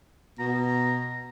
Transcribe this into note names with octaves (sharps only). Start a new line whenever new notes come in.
B2 A#5